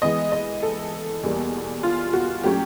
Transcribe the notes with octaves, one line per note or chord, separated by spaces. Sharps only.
E3 G#3 B3 D#5
D#5
A4
E2 B2 G3 A#3
F4
F#4
A#2 F#3 A3 C#4 G4